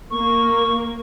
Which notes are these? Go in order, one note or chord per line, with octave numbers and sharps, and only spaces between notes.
A#3 C#6